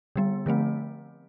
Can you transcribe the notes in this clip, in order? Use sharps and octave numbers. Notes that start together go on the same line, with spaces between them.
D3 G3 B3
D3 F3 A3 C4